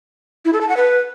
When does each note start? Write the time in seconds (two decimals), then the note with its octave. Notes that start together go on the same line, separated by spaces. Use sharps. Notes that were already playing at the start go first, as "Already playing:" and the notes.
0.45 E4
0.53 A4
0.61 A5
0.69 F#5
0.77 B4